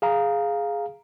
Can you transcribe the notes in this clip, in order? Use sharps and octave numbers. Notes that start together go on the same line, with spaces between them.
G#4 F5 A#5